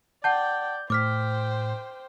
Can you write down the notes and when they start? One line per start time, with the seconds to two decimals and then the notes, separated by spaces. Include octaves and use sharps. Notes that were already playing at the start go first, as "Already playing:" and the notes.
0.24 D5 F#5 G5 A5 G6
0.90 A2 C5 G5 D6 F6 B6